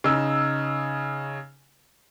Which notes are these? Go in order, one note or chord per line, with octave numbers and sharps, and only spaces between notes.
C#3 D#4 E6